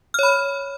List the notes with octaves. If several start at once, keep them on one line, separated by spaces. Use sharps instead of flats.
C#5 B5 F6